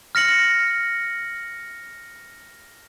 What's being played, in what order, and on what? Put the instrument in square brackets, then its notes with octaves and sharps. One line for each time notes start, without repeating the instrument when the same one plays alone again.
[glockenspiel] F6 A#6 C#7 F#7